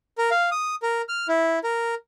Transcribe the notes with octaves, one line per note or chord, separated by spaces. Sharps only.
A#4
F5
D#6
A#4
F6
E4
A#4